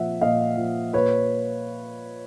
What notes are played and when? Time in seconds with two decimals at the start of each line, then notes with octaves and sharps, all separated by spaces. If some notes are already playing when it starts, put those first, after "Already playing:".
Already playing: A#2 F3 E5 F#5
0.21 A#2 D#5 F5
0.57 F3
0.93 A#2 B4 C#5